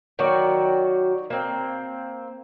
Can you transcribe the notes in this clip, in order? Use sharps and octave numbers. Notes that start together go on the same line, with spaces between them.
D#3 F#3 F#4 D5
A#3 C4